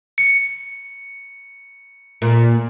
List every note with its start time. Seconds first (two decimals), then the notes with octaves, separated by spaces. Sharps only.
0.18 C#7
2.22 A#2